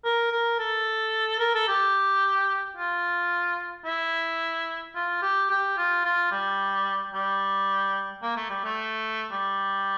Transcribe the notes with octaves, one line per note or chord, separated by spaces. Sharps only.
A#4
A#4
A4
A#4
A4
G4
F4
E4
F4
G4
G4
F4
F4
G3
G3
A#3
A3
G3
A3
G3